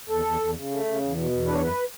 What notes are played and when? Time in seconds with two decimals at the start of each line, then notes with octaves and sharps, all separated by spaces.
0.09 E2 A4
0.25 E2
0.40 E2
0.55 C#3
0.70 A3
0.85 C#3
1.01 E2
1.16 B2
1.31 E2
1.46 D4 B4
1.54 C#5
1.61 F#2 B4